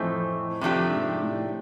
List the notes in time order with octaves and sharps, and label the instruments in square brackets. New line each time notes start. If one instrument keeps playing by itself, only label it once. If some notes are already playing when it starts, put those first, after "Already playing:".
Already playing: [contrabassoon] F2 [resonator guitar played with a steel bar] A2 E3 A3 C4 D#4
[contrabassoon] F2 [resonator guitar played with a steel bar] C3 F3 A3 D4 G4
[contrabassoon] G#2
A2